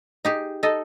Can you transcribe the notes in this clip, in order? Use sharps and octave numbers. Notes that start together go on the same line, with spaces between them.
D#4 G4 G#4
D#4 A4 D#5